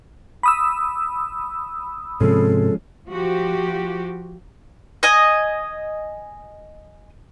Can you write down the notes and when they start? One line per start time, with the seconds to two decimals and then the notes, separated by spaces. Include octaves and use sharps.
0.43 B5 D#6 E6
2.21 G#2 C3 F3 G#3 C4 C#4 A4
3.09 F3 F#4 G4
5.03 D#5 G#5